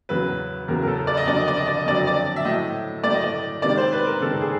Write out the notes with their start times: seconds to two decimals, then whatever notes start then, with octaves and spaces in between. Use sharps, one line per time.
0.09 E2 C#3 F#3 B4
0.68 E2 C#3 F#3 A#4
0.83 A#4
0.87 A4
1.07 D5
1.17 D#5
1.27 F2 D3 F#3 D5
1.37 D#5
1.48 D5
1.57 D#5
1.67 D5
1.77 D#5
1.86 F2 D3 F#3 D5
1.97 D#5
2.07 D5
2.36 E5
2.45 A2 F#3 A3 D#5
3.03 A2 F#3 A3 D5
3.13 D#5
3.24 D5
3.62 C3 D#3 G#3 D5
3.77 C5
3.92 B4
4.07 A#4
4.22 C3 D#3 G#3 A4
4.41 G#4